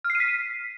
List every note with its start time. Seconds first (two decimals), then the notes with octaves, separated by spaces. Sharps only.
0.04 F6
0.10 C7
0.15 D#7
0.20 B6